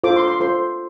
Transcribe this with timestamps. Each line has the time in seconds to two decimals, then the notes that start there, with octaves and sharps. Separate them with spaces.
0.04 F4 A4 C5 D6
0.16 C6
0.28 C6
0.40 F4 A4 C5 C6